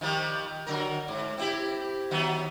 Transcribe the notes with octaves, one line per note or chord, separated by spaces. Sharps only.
D#3 F3 G3
D3 F#3 A#4
G#2
C4 E4 G4
D#3 F#3 B3